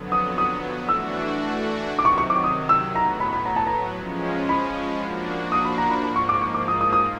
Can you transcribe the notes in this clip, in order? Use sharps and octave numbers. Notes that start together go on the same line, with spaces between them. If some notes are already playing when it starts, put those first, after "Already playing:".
Already playing: F2 D3 F#3 B3
D#6
D#6
E3 A3 D4 F#4 E6
C3 D#3 F#3
D6
C#6
C#6
D6
D#6
E6
A2 F#3 B3 A#5
B5
B5
A#5
A5
A#5
F3 G#3 C#4
B5
F3 A#3 D4 F#4
D#6
B5
A#5
B5
G#2 F3 A#3 B5
C#6
D6
C#6
D6
D#6
D#6
D#6